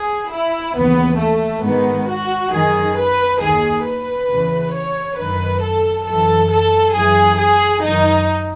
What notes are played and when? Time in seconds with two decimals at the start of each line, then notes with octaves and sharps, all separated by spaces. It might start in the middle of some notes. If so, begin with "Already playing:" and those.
Already playing: G#4
0.30 E4
0.75 D#2 C#3 E3 B3
1.18 A3
1.62 G#2 D#3 B3
2.08 F#4
2.51 F#2 D#3 G#4
2.96 B4
3.40 D#2 D#3 G#4
3.85 B4
4.28 E2 C#3 E3
4.73 C#5
5.17 F#2 D#3 B4
5.61 A4
6.05 F#2 E3 A4
6.50 A4
6.93 F#2 E3 G#4
7.38 G#4
7.82 F#2 D#4
7.87 D#3